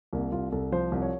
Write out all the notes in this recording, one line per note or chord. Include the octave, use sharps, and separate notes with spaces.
C2 A#3
C2 F4
C2 A4
F3 C5
C2
C#5